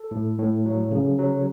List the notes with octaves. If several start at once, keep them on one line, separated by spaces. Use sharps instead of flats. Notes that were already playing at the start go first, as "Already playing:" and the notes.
Already playing: A4
A2
A2
F#3
C#3
F#3